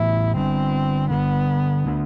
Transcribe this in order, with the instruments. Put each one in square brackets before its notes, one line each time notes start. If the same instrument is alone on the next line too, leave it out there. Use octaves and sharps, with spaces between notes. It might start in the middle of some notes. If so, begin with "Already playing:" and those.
Already playing: [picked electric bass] A2 E3 B3 [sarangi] E4
[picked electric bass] D3 G3 D4 [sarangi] C4
[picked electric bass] D3 G3 D4 [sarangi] B3
[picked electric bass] D3 A3 D4